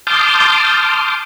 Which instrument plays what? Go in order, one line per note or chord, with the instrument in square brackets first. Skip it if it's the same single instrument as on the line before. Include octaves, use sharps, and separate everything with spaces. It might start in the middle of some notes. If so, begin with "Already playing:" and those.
[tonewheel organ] A5 C6 D6 D#6 F6 G6